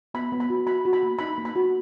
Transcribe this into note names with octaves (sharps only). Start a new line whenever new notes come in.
B3 B5
B3
B5
F#4
F#4 B5
F#4
B5
A#3
D#4 B5
A#3
B5
F#4